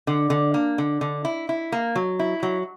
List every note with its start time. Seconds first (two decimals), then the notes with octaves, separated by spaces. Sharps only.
0.07 D3
0.30 D3
0.54 A#3
0.78 D3
1.01 D3
1.25 E4
1.49 E4
1.72 A#3
1.96 F#3
2.19 E4
2.43 F#3